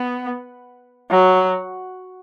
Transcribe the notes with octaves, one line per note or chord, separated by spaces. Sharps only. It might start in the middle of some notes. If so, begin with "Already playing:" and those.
Already playing: B3
F#3